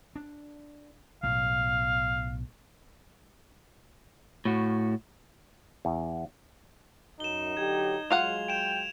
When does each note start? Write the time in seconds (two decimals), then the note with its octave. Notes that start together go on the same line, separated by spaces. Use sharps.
0.16 D4
1.23 B1 A2 F5
4.45 A2 F#4
5.85 E2
7.20 F#2 D#4 E7 G7
7.57 D3 F#3 G4 G#6
8.11 F#3 G#3 F4 F5 F#5 F7
8.48 G5 D7 E7